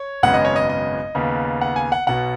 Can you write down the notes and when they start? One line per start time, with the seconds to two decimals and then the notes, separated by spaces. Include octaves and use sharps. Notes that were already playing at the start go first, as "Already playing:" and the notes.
Already playing: C#5
0.23 G#1 F#2 C#3 G#3 B3 F#5
0.34 D#5
0.45 C#5
0.56 D#5
0.69 D#5
1.15 D#2 C#3 B3
1.61 F#5
1.76 G#5
1.92 F#5
2.07 B1 B2 B3 F#5